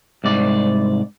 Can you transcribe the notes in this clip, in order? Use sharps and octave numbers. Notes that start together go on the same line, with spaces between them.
C2 G#2 D5